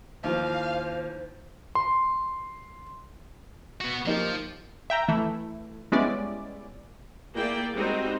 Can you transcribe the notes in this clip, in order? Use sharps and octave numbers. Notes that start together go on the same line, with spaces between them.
D#2 E3 F3 C5 F5
C6
B3 F#4
F3 A#3 D#4 G4
E5 G5 A#5
E3 A3 E4
G3 G#3 B3 C#4 E4 D5
A#3 E4 G#4 D5 G5
G3 G#3 C4 D#4 F#4